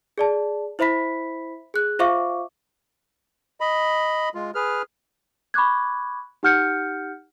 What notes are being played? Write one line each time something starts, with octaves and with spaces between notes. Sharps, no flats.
G#4 D5 A5
E4 C5 E5 B5 B6
G#4 F#6
F4 C5 E5 F5 C#6 D6
D#5 B5
G#3 F4
G#4 B4 F6
B5 C#6 D6 F#6 G#6
D#4 G4 F#5 F6 G6 C#7